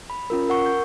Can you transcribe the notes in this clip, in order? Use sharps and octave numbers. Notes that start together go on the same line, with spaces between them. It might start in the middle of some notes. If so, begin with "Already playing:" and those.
B5
C#4 F4 A#4
A#4 F#5 C#6
G6